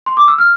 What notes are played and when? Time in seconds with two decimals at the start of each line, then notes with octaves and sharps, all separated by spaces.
0.06 C6
0.17 D6
0.28 E6
0.38 F6